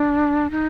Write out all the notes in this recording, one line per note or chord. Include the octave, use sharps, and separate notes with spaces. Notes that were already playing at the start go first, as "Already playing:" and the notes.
Already playing: D4
D#4